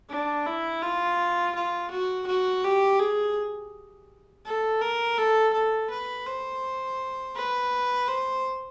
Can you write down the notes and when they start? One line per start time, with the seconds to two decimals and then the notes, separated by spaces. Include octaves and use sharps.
0.10 D4
0.46 E4
0.82 F4
1.55 F4
1.91 F#4
2.27 F#4
2.64 G4
3.00 G#4
4.46 A4
4.81 A#4
5.18 A4
5.53 A4
5.90 B4
6.26 C5
7.36 B4
8.08 C5